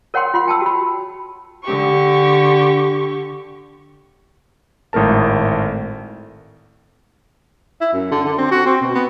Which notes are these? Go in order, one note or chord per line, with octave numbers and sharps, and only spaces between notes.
A#4 C#5 F#5 G5 C6
F4 F#5 C6
G5 A5 E6
F#4 B5
D3 G4 C#6
G#1 A2 A3 A#4 A5
E4
F#2
D3
D3
C4
F#4
C4
B2
B3